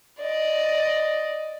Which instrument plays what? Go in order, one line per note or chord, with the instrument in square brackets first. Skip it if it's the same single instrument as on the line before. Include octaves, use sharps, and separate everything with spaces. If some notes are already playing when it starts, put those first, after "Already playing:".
[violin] D5 D#5